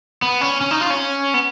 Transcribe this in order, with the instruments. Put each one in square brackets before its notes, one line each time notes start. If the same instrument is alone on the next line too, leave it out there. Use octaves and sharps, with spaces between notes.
[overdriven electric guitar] B3
C#4
C#4
D#4
F4
C#4
B3